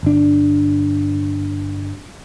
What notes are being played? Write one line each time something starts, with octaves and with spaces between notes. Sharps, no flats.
G1 D4